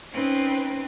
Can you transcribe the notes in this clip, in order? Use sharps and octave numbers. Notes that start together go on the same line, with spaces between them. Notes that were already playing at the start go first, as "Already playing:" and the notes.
C4 C#4 D#4 B4 G5